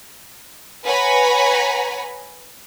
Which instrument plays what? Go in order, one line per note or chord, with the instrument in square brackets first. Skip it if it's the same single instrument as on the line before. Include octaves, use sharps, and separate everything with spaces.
[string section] B4 C#5 F#5 G#5 A#5 B5